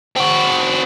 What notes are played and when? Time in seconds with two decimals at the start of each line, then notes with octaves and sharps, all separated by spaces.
0.16 C4 F#4